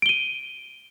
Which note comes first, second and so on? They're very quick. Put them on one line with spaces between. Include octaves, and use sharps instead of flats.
D7 G7 D#7